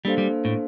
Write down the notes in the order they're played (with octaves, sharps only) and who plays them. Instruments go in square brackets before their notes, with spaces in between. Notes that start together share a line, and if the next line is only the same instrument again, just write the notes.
[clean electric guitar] G3 [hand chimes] A#3 D4 A4 C5 F5
[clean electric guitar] G3
A2